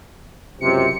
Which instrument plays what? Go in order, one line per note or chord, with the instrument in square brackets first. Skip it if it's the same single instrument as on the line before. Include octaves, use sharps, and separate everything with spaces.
[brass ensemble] C#2 F#2 C3 [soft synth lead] C#7